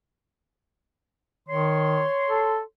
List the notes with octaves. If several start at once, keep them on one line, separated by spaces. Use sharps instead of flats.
D#3 C#5 C6
A4